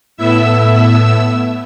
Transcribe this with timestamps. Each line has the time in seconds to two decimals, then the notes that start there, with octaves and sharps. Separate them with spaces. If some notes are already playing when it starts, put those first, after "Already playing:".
0.17 A2 A3 B3 E4 E5 E6